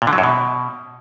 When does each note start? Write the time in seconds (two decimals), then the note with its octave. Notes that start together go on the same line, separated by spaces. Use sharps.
0.02 A#2
0.07 D3
0.13 F#3
0.18 F#2
0.23 B2